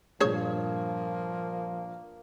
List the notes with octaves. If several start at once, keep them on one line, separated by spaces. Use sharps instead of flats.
G2 A#2 F3 A#3 G#4 C5 C#5